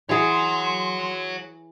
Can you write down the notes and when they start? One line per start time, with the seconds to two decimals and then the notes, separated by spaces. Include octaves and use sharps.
0.09 E3 G#4 C#5 F#5 C6